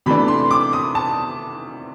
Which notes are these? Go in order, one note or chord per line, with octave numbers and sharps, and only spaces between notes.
C3 E3 A3 D4 B5
C6
D6
D#6
A5